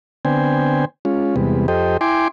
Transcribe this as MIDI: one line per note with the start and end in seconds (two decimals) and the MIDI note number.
0.25 0.85 50
0.25 0.85 59
0.25 0.85 60
0.25 0.85 72
0.25 0.85 79
0.25 0.85 80
1.05 1.35 56
1.05 1.35 61
1.05 1.35 65
1.36 1.67 40
1.36 1.67 48
1.36 1.67 55
1.36 1.67 56
1.36 1.67 59
1.68 1.97 41
1.68 1.97 67
1.68 1.97 69
1.68 1.97 72
1.68 1.97 75
1.68 1.97 79
2.01 2.28 64
2.01 2.28 79
2.01 2.28 80
2.01 2.28 84
2.01 2.28 86